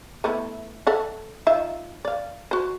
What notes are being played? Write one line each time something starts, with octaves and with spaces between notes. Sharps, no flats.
A3 B3 E4
A4 E5 F#5
D#4 F4 E5
D5 F5
F#4 C5